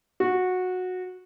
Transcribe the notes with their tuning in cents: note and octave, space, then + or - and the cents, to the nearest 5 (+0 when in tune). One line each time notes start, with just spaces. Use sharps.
F#4 -15